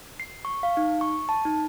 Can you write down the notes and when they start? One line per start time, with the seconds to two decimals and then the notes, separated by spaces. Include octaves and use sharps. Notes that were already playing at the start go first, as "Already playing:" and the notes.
0.20 C7
0.45 C#6
0.63 F5
0.77 D#4
1.01 C#6
1.29 A5
1.45 D#4